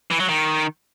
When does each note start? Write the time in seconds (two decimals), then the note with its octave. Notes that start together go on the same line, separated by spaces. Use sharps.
0.11 E3
0.20 F#3
0.29 D#3